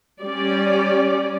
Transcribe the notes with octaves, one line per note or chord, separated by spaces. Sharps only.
G3 C#4 D5